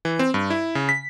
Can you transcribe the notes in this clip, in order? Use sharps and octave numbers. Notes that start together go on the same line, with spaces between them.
E3
C4
G2
E4
C#3
B6